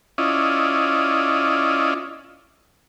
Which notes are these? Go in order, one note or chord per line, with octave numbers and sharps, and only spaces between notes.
C#4 E4 F4 D5 D#5